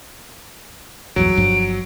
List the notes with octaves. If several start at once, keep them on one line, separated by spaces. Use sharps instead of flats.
A#1 E2 G2 F#3 D7
G1 G2 F3